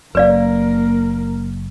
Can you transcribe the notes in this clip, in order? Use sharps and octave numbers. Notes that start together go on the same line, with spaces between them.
F#1 F#2 A#3 A#4 B4 D5 F5